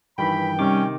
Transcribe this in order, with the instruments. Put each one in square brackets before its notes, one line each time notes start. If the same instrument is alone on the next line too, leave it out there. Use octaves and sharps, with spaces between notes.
[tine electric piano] G2 D#3 E3 [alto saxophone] G5 [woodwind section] B5
[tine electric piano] C3 D#3 D6 [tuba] G3 [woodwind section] C#4